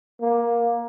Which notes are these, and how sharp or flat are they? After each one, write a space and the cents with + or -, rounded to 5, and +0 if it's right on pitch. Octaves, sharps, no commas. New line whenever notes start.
A#3 +15